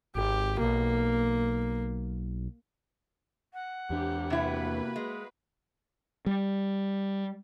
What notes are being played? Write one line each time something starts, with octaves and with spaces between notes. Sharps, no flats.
G#1 G4
B1 A#3
F#5
E2 D4 G4
C3 A#3 E4 F#4 B4
G#3
G3